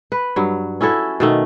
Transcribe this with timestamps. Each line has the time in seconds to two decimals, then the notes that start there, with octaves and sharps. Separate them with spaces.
0.12 B4
0.36 G2 F#3
0.81 C#4 E4 F#4 A4
1.20 B2 D#3 A3